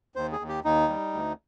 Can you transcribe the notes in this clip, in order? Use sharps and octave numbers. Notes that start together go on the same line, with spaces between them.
D#2 C5
G#4
D#2
G4
D#2 D#4
G3
D2